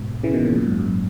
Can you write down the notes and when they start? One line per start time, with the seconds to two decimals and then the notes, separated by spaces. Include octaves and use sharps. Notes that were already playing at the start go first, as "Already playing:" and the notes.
Already playing: G#2 B2
0.23 C#3 E3
0.34 B2 D#3
0.45 A#2 C#3
0.56 F#2 A#2
0.66 G#2
0.78 F#2